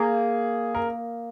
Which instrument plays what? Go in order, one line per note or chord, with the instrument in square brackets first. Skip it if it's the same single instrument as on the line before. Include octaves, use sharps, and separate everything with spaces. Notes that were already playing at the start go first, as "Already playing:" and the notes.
Already playing: [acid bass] A#3 [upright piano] G#4
[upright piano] A#4